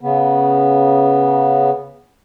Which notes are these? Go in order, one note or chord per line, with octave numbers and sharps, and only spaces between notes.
C#3 B3